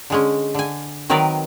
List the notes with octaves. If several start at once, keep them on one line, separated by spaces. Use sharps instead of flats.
D3 G#3 C#4
D3 G#5
D#3 F#3 C4 A#4 B4 D5